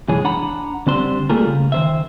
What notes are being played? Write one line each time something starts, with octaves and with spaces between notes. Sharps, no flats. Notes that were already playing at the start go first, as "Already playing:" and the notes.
B1 F#2 E3 G#3 G#4 C#5
D4 F#5 A#5 B5
D3 G3 C4 D4 C5 C6
G3 A3 A#3 F4 G#4 A#4
C#3
D#3 C5 E5